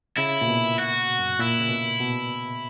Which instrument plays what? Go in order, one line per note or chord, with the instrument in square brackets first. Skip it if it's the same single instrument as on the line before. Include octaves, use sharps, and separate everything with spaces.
[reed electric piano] C#3 [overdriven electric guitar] E4
[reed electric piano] A#2
B2
[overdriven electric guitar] F#4
[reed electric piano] F#2
[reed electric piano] A#2 [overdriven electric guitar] E4
[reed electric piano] C#3
B2
B2